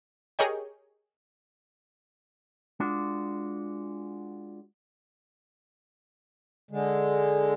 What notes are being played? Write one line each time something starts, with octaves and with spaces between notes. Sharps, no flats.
G4 G#4 A#4 C#5 D#5 G5
G#3 D4 F4 F#4
D3 G#3